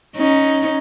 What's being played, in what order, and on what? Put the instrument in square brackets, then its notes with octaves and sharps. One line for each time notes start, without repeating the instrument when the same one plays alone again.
[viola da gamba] C#4 D#4